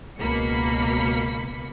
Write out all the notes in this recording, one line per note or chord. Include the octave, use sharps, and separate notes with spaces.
C#2 B2 A#3 B5 C#7